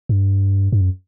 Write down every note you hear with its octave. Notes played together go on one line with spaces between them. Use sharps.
G2
G2
F#2